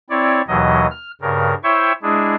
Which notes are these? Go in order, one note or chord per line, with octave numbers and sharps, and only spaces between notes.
C4 E4 C#5 D5
D#2 B2 E3 F#3 D#5
F6
G2 C#3 A#4
E4 C5 C#5 E5 G5 C#6
G#3 D4 E4 G#4